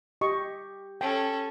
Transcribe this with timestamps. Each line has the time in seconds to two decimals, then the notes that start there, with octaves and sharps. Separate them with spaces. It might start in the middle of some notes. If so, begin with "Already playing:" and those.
0.21 G4 D#5 C#6
1.01 C#4 A4 G5